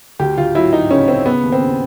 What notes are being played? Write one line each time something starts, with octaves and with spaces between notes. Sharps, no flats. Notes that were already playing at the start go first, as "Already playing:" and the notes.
D2 G4
D2 F4
F#3 E4
F#3 D#4
C#3 C#4
C#3 C4
C#3 B3
D#2
C4
C#3